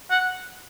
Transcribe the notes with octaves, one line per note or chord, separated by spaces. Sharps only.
F#5